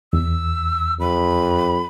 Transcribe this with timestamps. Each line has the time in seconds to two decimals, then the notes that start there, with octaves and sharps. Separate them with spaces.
0.13 E2 E6
1.00 F2 B5